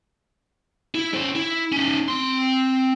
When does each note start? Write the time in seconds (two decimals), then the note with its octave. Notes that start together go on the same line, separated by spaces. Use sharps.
0.95 E4
1.14 C#4 C5
1.35 E4
1.72 C#4 D#4
2.08 C4 C6